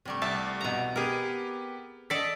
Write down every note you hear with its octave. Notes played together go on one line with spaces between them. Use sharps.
C3 G3 A3
C2 E5 G5 A5
B2 A#5
B3 G4 G#4 A#4 D#7
A4 D5 D#5 A5 B6